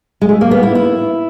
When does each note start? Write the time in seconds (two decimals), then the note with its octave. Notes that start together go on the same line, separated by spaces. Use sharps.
0.21 G#3
0.29 A3
0.41 A#3
0.51 B3
0.63 E4
0.75 E4